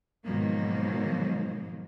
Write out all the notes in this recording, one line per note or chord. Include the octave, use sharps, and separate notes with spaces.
G#2 B2 D#3 F3 F#3 A#3